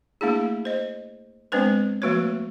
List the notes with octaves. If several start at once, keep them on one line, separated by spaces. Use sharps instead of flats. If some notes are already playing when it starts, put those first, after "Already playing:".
A3 A#3 D4 E4 G#4
C5 D#5
G#3 B3 C4 D4 B4 C5
F3 A3 A#3 F#4 B4 C#5